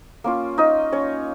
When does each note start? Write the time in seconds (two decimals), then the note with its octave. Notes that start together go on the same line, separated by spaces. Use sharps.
0.24 A#3 C#4 F4
0.58 D#4 D#5
0.92 C#4 C#5